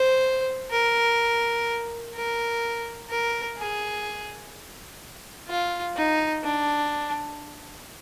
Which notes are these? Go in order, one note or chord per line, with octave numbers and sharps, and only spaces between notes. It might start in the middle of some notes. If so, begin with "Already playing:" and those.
Already playing: C5
A#4
A#4
A#4
G#4
F4
D#4
D4